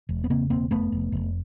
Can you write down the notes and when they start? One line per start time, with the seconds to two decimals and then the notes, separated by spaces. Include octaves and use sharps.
0.09 E1
0.24 B3
0.30 C#3 A#3 C4
0.50 E1 A#3 C4
0.71 F1 A3 B3
0.92 F1
1.12 F1